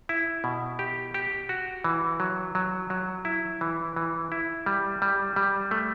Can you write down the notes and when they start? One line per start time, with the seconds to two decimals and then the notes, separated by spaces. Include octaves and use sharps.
0.09 E4
0.44 B2
0.79 G4
1.14 G4
1.49 F#4
1.84 E3
2.20 F#3
2.55 F#3
2.90 F#3
3.25 E4
3.61 E3
3.96 E3
4.32 E4
4.66 G3
5.02 G3
5.36 G3
5.71 A3